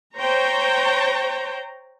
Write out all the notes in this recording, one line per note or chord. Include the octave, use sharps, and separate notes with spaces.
C5 C#5 G5 A#5